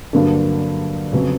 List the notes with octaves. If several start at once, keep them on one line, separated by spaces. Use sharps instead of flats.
G2 D3 F#3 A#3 D4
F2 C#3 F#3 B3